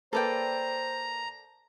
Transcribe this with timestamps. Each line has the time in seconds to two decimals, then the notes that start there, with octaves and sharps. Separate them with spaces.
0.13 A#3 A4 B4 C5 D5 G5 A#5